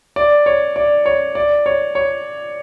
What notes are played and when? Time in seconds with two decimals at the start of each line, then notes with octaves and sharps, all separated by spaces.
0.16 D5
0.46 C#5
0.76 D5
1.06 C#5
1.35 D5
1.66 C#5
1.95 C#5